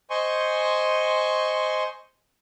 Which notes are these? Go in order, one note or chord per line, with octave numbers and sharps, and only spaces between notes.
C5 D#5 G#5 C6 C#6